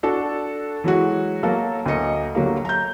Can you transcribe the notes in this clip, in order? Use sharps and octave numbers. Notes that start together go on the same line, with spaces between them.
D4 F#4 A4
E3 F#3 G#3 F#4
F#3 A#3 A4
D2 A#3 D#5 C#7
D3 F#3 G3 A#3
A#5 G6